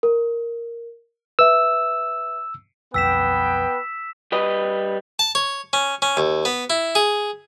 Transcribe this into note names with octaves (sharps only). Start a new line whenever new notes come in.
A#4
B4 E5 E6
B1 F2 B3 B4 G5 E6 B6 E7
G3 B4 D#5
A5
C#5
C#4
C#4
D#2
B3
E4
G#4